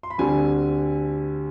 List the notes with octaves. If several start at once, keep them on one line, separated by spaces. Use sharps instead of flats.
C6
B5
D2 D3 G3 C4 G#5